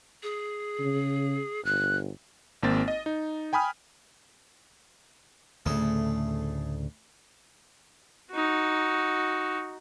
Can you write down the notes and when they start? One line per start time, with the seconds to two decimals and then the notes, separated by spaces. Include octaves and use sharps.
0.23 G#4
0.80 C#3
1.65 G1 F#6
2.63 G#1 A#3 C4 A6
2.88 D#5
3.06 D#4
3.53 G5 G#5 B5 D#6 F6
5.66 D2 A2 C#3 A3 G#4
8.32 D#4 F#4